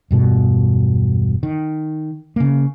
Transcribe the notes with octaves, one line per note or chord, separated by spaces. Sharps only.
E1 G2 B2
D#3
C#3 A#3